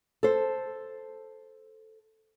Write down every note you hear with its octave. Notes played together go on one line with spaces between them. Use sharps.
A4 C5